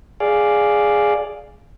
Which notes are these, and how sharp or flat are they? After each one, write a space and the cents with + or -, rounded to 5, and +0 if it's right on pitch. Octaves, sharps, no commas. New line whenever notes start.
G#4 +0 D5 +0 F5 +0